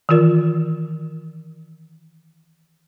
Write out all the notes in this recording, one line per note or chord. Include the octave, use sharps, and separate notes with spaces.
D#3 E3 F4 A#4